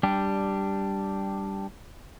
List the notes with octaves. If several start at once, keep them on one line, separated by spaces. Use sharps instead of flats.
G3 D4 G4